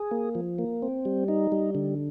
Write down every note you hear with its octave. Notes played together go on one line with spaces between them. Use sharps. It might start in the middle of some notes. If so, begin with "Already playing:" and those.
Already playing: G#4
A#3
F3
A#3
C4
G3
D#4
G3
D3